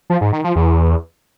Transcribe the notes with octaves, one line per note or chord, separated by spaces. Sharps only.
F3
G#2
D#3
F3
E2